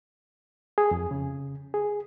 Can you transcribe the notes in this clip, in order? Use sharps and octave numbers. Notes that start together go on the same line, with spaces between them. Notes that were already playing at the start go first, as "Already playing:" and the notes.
G#4
F2
C#3
G#4